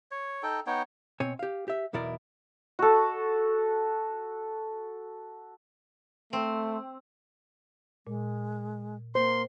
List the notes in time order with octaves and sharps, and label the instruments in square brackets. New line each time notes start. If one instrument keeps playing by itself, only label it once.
[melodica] C#5
D#4 A4 G5
B3 D#4 C#5 G5
[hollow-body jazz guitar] B2 C4 C#5 G#5
G4 F5
G4 E5
B1 E2 B2 E4 A#4 D5
[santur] F#4 A4
[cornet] A3 [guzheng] C4
[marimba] A#2 [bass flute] G#3
[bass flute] A#3 [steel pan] C5 [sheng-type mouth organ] C6